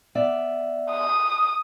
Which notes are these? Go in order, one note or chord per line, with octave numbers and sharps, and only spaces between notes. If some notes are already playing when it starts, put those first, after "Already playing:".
B3 D5 E5
D#6